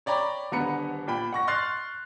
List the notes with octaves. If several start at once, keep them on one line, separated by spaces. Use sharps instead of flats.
C#5 D5 G5 A#5 B5
D#1 D3 B3 A#5 B5 C#7
A#2 G5 B5
F#5 C#6 A#6
C6 C#6 F6 F#6 A6 C7